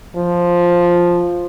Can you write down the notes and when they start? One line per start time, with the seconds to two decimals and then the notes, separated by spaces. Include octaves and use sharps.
0.16 F3